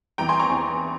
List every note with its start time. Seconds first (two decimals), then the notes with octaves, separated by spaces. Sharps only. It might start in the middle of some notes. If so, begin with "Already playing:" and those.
0.18 E2 E3 G5 A#5
0.29 G#5 C6
0.40 A#5 C#6
0.50 E2 E3